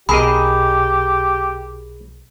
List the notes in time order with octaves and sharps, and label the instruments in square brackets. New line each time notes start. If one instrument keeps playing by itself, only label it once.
[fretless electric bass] B1 [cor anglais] G4 [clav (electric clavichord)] G#4 A#4 D#5 [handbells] B5